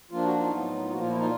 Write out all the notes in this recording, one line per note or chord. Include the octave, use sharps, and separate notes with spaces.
F3 A#3 D4 F4
F#4
D#4 F4
A2 F#3 B3
A#2 F3 A#3 F#4
F4
E4
D#4 F4